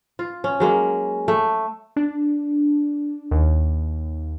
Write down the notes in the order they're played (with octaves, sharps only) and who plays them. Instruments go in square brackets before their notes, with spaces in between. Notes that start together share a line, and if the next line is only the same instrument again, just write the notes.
[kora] F4
C#4
F#3 G#3 A#3
A3
[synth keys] D4
D#2